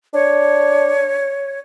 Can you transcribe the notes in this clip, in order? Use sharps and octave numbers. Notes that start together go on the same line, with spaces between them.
D4 C#5